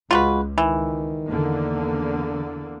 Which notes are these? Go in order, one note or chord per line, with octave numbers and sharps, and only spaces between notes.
C#2 G#3 F4 F#4 B4
D#3 E3
E2 D3 A#3